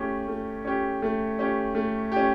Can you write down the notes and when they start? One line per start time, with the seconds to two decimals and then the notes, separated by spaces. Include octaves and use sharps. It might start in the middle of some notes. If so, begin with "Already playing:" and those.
Already playing: A3 C#4 G4
0.28 A3
0.65 C#4 G4
1.02 A3
1.39 C#4 G4
1.75 A3
2.12 C#4 G4